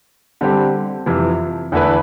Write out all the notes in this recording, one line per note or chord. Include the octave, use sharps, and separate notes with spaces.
D3 G3 C4 G4
F2 C3 E3
E2 D3 A3 E4 B4